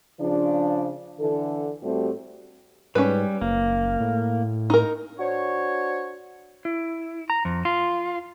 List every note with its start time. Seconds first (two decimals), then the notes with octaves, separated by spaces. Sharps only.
0.21 C#3 F3 D4
1.20 D3 E3 A4
1.83 A2 G3 A3 C4 F#4 G4
2.95 G#2 G3 C#4 B4
3.41 F#1 A#3
4.01 A2
4.70 D#4 A#4
5.19 D4 F#4 C5 C#5
6.65 E4
7.30 A#5
7.45 F2
7.65 F4